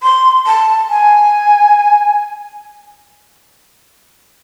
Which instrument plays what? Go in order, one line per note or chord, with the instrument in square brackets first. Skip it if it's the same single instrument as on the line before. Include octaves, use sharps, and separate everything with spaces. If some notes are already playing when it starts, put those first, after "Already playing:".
[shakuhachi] C6
A5
G#5